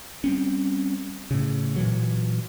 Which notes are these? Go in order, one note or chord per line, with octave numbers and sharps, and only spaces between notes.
G3 C4 C#4
A2 C#3
A#2 E3 F#3